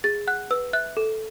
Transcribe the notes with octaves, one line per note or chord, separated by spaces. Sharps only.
G#4 A6
F#5 F#6
B4 E6
E5 F#6
A4